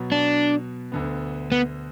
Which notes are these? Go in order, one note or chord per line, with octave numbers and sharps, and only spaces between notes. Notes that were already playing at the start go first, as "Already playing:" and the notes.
Already playing: B2 F#3 B3
D4
D2 D3 B3
B3